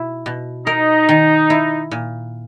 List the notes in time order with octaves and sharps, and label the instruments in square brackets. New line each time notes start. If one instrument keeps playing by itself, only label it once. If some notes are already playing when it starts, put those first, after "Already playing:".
Already playing: [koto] B2 E4
B2
[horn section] D#4 [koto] A#4
[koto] D#3
E4
A#2